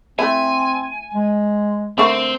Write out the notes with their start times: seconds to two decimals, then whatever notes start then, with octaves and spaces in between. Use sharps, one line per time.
0.19 A3 C4 E4 G#5
1.14 G#3
1.98 D3 A3 C4 A#4